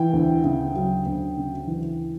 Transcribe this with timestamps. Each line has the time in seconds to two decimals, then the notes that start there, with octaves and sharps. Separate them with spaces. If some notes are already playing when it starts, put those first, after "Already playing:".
Already playing: E3 G5
0.13 D2
0.44 C#3
0.75 F#3
1.06 D2
1.37 C#3
1.67 E3